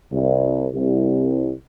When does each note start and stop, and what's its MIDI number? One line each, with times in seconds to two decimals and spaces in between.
0.13 0.68 36
0.75 1.54 36